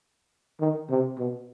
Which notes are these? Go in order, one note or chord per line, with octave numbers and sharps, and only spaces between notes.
D#3
C3
B2